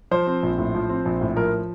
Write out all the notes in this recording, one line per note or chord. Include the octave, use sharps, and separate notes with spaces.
F3 C5
C4
A#1
A2
F3
C4
A#1
A2
F3 A#4